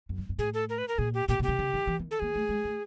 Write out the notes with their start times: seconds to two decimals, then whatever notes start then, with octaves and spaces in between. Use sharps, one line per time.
0.09 F#2
0.18 G2
0.29 G2
0.38 A2 G#4
0.54 A4
0.69 A#4
0.78 B4
0.88 A#4
0.98 A#2 G#4
1.14 G4
1.29 A#2 G4
1.39 B2
1.43 G4
1.48 C3
1.59 C#3
1.74 D#3
1.87 E3
1.99 D#3
2.11 A4
2.20 A#3 G#4
2.36 A3
2.49 G#3
2.64 A3